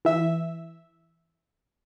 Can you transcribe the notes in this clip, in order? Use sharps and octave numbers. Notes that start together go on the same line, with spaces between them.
E3 E5